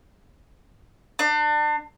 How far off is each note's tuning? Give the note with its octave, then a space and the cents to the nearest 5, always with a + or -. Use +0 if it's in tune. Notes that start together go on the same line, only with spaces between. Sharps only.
D4 +35